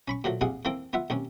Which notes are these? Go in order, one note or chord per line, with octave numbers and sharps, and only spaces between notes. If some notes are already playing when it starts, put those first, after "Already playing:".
C#4 B5 C#6
A#2 F3 F#3 A3
A#1 C3 G#4 F5 F#5
E3 A#3 C4 A4
B3 F4 E5 F#5
D#2 C3 C#4